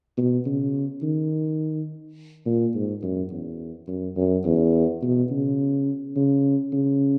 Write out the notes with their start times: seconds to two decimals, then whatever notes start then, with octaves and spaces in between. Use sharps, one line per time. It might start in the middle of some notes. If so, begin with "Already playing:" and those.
0.17 B2
0.46 C#3
1.03 D#3
2.46 A#2
2.75 G#2
3.03 F#2
3.32 E2
3.88 F#2
4.17 F#2
4.45 E2
5.02 B2
5.31 C#3
6.17 C#3
6.73 C#3